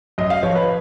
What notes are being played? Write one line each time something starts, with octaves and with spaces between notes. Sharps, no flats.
F#2 D#5
F5
F3 C#5
B4